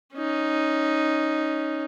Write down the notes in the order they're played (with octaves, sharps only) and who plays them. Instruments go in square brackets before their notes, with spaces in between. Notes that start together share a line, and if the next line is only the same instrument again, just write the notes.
[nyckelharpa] C#4 D#4